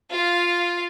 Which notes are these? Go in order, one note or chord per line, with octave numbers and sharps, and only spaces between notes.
F4 F5